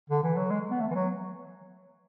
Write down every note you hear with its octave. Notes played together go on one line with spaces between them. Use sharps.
D3
E3
F#3
G#3
B3
A3
E3
F#3